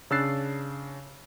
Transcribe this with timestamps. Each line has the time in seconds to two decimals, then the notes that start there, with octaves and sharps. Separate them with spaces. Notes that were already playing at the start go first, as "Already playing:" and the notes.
0.11 C#3 D4 E6 F#6 A6 C7